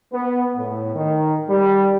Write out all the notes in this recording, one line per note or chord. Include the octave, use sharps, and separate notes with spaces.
B3
A2
D#3
G3